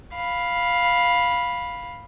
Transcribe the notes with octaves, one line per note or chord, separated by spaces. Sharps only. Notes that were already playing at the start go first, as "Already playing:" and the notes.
F5 B5